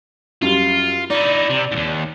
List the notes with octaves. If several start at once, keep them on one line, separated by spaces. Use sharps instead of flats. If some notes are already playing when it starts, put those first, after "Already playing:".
F#2 G3 F4
D#4 E4 D5
C3
D#2 G#2